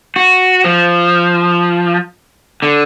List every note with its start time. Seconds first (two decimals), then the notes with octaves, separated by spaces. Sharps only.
0.16 F#4
0.64 F3
2.62 D3